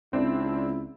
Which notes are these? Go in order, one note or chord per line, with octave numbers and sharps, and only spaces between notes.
C#2 C4 D4 E4